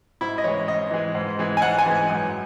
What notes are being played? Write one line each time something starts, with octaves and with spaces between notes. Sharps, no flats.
G#2 E4
D#5
E3 G#3 C#5
G#2 D#5
E3 G#3
G#2
E3 G#3
G#5
G#2 F#5
G#5
E3 G#3
F#2